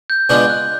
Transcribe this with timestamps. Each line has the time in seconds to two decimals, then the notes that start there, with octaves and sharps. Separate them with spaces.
0.10 G6
0.29 B2 G#3 B3 D4 F4 G6
0.50 F#6